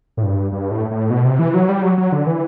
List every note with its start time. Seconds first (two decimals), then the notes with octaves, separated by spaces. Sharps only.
0.17 A2
0.23 G2
0.52 G2
0.71 A2
0.91 A2
1.11 B2
1.25 C3
1.39 E3
1.54 F#3
1.69 G3
1.82 F#3
1.98 F#3
2.12 D3
2.27 E3